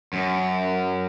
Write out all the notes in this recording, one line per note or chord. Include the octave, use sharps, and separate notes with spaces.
F#2